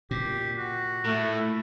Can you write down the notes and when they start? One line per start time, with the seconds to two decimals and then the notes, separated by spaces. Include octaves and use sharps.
0.11 A#2 G4
0.57 F#4
1.05 A2 A3